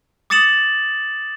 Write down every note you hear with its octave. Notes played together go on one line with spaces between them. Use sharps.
D6 D#6 A6 C#7 E7 F#7